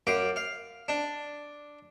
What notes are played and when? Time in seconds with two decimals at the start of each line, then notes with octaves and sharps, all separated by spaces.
0.07 F#2 F5 D6
0.36 F5
0.88 D4